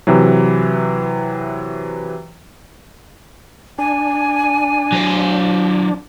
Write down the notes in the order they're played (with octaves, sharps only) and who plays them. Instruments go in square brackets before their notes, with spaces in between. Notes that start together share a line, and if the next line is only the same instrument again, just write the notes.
[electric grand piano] C3 E3 F#3
[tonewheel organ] D4 [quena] G#5
[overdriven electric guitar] F#3 C5